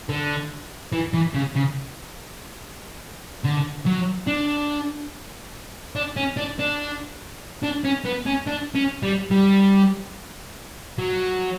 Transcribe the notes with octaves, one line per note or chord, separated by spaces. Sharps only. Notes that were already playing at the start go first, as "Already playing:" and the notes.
D3
E3
E3
C#3
C#3
D3
F#3
D4
D4
C#4
D4
D4
D4
C#4
B3
C#4
D4
C#4
G3
G3
F#3